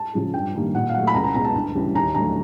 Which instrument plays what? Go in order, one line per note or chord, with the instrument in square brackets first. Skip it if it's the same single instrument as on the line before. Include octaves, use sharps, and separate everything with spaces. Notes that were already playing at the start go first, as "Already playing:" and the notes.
Already playing: [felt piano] A5
C#3 F3 G#3
G2 G5
D#3 G3 A#3
A#2 F#5
F5
F#3 A3 F#5
B5
C#2 A#5
A#5
B2 G#3 A#5
A5
D2
C#3 E3 G3
D#2 A#5
D3 F#3 A3 A#5